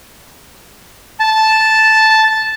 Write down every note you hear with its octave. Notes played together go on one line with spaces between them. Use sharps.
A5